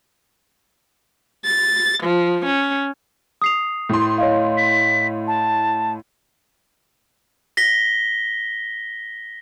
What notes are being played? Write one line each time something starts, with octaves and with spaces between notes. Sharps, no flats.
A6
F3
C#4
D#6 C7 F7
A2 C6
C#5 D#5 F5
B6
A5
A#6 B6 G7